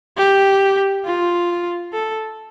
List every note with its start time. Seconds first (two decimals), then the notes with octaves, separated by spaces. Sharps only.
0.17 G4
1.05 F4
1.93 A4